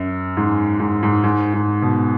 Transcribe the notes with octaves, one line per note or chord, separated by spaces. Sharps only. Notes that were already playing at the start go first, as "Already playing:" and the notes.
Already playing: F#2
G#2
G#2
G#2
G#2
G#2
B2